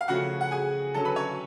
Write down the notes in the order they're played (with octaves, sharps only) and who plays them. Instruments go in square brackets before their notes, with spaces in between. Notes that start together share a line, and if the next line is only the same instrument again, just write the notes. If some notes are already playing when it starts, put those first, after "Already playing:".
[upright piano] F5
C#3 F3 A3 C#4 F#4 F#5
F#5
G#4 G#5
D3 F#3 C#4 A4 A5
B4 B5
C#5 C#6